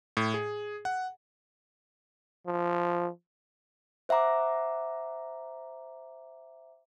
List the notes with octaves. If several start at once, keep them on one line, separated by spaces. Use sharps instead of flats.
A2
G#4
F#5
F3
C5 E5 F#5 A#5 D6